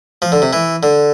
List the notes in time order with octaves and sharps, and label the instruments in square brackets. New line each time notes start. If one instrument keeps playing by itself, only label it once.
[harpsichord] F3
D3
C3
E3
D3